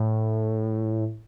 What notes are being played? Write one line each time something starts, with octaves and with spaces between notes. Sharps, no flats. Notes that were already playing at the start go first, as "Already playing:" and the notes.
Already playing: A2